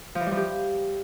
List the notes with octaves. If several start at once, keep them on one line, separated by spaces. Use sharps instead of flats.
F3
E3
G3
F3
G4